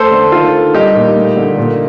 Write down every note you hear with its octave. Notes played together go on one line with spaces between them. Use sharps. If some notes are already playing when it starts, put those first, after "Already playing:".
Already playing: A3 A4 C5
D3
D#3 F4 A4
D#3
G3 D#4 G4
A#2
A3
D3
A#2